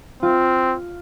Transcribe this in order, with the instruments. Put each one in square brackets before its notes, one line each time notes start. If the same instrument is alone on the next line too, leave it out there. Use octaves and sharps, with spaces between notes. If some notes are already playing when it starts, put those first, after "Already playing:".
[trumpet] C4 [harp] F4